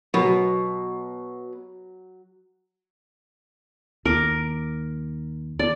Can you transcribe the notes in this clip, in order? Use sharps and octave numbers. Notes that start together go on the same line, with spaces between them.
B2 F#3
D#2 A#4 D6
D5